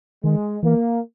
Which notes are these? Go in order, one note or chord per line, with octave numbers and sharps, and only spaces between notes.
D#3 G#3
E3 A#3